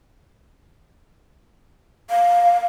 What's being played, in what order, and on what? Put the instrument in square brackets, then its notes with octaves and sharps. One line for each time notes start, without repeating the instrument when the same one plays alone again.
[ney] F5